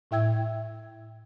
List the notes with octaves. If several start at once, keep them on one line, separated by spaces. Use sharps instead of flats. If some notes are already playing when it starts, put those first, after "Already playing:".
A2 E4 E5 G5 E6 G#6